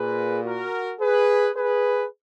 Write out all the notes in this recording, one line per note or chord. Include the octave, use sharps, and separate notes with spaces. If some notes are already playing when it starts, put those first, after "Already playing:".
Already playing: A#2 G#4 B4
F#4 A#4
G#4 B4
G#4 B4